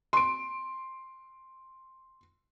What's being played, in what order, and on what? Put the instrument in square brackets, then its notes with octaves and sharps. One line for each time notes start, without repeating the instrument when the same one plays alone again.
[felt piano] C6 D7